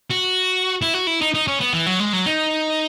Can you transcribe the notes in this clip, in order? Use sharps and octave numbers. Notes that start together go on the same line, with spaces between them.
F#4
E4
F#4
E4
D#4
D#4
C#4
B3
E3
F#3
G#3
F#3
D#4